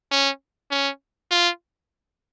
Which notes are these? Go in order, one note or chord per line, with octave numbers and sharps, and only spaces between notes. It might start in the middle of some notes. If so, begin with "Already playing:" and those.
C#4
C#4
F4